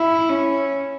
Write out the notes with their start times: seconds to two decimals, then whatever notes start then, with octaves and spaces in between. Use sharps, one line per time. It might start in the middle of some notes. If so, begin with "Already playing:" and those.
Already playing: E4
0.29 C#4